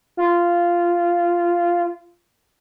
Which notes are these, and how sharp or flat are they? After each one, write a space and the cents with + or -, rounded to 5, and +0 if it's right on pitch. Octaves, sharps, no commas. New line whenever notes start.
F4 -10